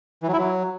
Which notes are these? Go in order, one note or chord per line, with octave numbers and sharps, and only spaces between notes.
E3
F#3
E4
F#3